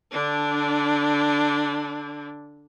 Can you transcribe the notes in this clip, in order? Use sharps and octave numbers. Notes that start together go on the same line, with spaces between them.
D3 D4